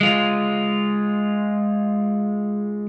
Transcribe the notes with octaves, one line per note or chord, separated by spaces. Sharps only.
G#3 F4